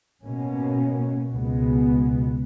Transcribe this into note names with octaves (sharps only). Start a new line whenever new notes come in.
B2 A#3 C#4
C#2 B2 G#3 B3